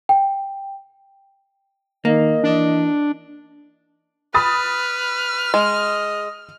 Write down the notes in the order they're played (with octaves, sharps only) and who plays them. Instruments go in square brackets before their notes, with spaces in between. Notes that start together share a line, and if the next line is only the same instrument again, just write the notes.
[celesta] G5
[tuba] D#3 [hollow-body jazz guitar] A#3 [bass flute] D#5
[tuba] E3 [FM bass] D4
[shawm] B4 [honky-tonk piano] B5 D#6 A6 [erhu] F6
[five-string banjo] G#3 [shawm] D#5